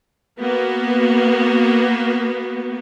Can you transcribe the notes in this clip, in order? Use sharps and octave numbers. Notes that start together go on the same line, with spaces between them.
A#3 B3 F#4